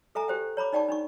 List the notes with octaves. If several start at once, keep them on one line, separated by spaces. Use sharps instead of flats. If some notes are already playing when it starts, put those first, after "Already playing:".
A4 E5 G#5 A#5
G4 C5 G5
C#5 A#5 B5 D6
D#4 D5 G5 A5 C#6
D4 D#4 C#6